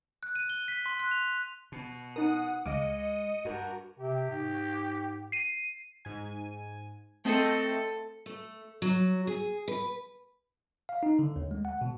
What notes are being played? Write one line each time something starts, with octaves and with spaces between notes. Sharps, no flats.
F#6
D#7
G7
B6
C6
F#6
F7
B2
D#4 A#4 F#5 D#6
C#2 G#3 D#5 F5 D6 C#7 D#7
G2 F#4 A#4
C3 G4
G#2
C7 D#7
G#2 G#5
A3 C4 A4 D#5
A3
F#3
G#4
B4
F5
D#4
D3
D#2
G#3
F#5
B2